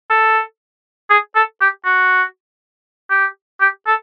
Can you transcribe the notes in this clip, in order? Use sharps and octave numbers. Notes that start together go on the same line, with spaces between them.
A4
G#4
A4
G4
F#4
G4
G4
A4